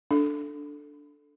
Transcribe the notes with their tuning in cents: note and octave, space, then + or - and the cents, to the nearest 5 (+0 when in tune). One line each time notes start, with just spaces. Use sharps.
D4 +0 A4 +0